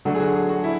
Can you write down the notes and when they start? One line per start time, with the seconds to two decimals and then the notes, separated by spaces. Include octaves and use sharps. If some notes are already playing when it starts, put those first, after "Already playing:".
0.05 D3 F#3 A3 D4 F#4
0.14 G#4
0.20 F#4
0.35 G#4
0.49 F#4
0.64 E4